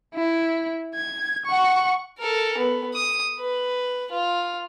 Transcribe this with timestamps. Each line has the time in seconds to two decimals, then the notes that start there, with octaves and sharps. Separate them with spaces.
0.15 E4
0.95 G#6
1.45 F#5 C#6
2.18 A4 A#4
2.58 B3
2.94 D#6
3.39 B4
4.11 F4